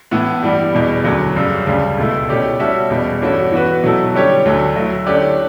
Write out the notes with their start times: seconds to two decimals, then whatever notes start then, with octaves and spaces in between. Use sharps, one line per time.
0.11 A2 E3 B3 E4
0.43 G2 E3 G3
0.73 E2 B2 G3
1.04 D2 D3 F#3 C#4
1.36 F#2 C#3 G3
1.67 D2 C#3 G3
1.98 C#2 B2 A3 E4
2.29 B2 A3 C#4 G4 D5
2.59 G3 C#4 F#4 A4 E5
2.90 E2 B2 G3
3.22 G2 E3 A3 C#4 F#4
3.52 E3 B3 F#4 B4
3.84 B2 F#3 A3 E4 A4
4.14 D3 G3 C#4 G4 C#5
4.45 D2 D3 F#3 A3
4.76 F#3 A3 E4
5.06 D3 A3 C#4 G4 D5